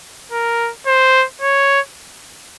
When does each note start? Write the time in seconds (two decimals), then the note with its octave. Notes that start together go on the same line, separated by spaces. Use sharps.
0.32 A#4
0.87 C5
1.41 C#5